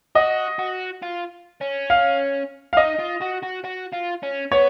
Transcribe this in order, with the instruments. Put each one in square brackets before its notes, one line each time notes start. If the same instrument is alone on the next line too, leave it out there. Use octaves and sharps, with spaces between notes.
[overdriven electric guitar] F#4 [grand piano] D#5
[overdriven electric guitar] F#4
F4
C#4
[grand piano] F5
F5
[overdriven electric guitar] D#4 [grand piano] D#5
[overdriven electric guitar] F4
F#4
F#4
F#4
F4
C#4
[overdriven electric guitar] B3 [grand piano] C#5